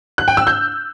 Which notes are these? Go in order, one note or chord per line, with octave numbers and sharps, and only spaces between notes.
F#6
G5
E6
G6